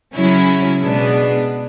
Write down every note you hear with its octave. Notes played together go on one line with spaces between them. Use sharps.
C#3 F#3 C#4 E4
B2 G#3 B3 D4